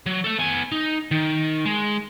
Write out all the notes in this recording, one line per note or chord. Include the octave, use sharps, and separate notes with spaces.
F#3
A4 E5
B3 G#5
D#4
D#3
G#3